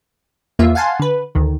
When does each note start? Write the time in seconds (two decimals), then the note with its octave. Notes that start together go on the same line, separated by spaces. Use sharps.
0.59 E2 A#3 F4 E5
0.75 F5 F#5 G#5 A5 C6
0.99 D3 B4
1.35 D2 D#3